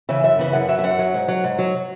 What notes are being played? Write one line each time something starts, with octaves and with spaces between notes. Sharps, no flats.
C#3 E3 E5
F#2 E5
C#3 E3
F#2 F#5
F#3 E5
E5
F#2 F#5
F#3
G#2
F#3
G#2
F#3